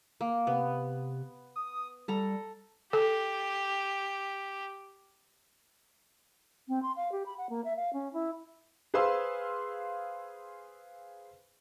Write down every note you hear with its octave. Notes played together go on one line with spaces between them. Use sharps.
A#3
C3 B3
D#6
G3 A4 A#5
G4 A4
C4
C6
F5
G4
B5
F#5
A#3
E5
F5
C#4
E4
G#4 B4 C5 F5 C6 E6